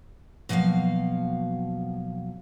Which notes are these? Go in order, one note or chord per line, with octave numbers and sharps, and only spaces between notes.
B2 F3 F#3 A#3 F5